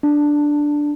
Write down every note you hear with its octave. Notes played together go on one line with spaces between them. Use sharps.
D4